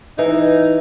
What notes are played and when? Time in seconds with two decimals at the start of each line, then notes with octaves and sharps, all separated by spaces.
0.18 E3 D#4